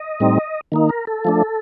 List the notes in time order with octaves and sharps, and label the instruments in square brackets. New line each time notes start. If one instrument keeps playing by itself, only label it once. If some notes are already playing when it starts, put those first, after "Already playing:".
Already playing: [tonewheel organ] D#5
A2 G3 C4 D#4
D#3 A#3 D#4
A#4
A4
F3 A3 D4